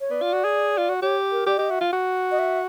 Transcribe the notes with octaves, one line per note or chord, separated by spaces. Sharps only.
C#5
B3 D5
F4
F#4
G#4
F4
F#4
G4 C#5
A#4
G4 D5
G4 D#5
F#4 E5
F4
F#4
D#5
E5